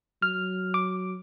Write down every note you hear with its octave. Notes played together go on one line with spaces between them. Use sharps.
F#3 F6
D6